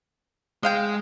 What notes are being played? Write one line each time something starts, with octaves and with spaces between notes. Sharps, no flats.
G#3 D#5 F5 G5